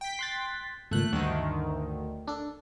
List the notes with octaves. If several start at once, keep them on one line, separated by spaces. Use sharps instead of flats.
G5 B6
C6 F#6 A6
G#1 C#2 A#2 A3 F#6
D2 G2 D#3
D4 A4